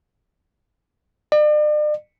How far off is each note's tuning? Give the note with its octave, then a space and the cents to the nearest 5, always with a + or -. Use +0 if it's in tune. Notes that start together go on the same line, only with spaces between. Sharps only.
D5 +40